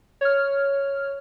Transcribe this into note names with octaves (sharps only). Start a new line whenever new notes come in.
C#5 F6